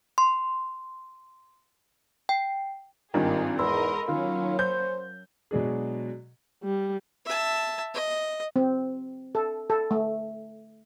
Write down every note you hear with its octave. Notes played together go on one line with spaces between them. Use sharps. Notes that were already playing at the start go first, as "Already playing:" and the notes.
C6
G5
G#1 G2 D#3 C4 F4 G4 G#4
E2 G#2 A#4 D#5 B5 C6 E6
D#3 F#3 A#3 C#4 F4
C5 G6
B2 F#3 G#3 D4 G#4
G3
E5 A5
D#5
C4
A4
A4
A3